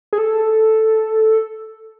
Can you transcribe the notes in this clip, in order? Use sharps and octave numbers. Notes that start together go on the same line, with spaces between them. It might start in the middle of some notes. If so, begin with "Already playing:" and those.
G#4
A4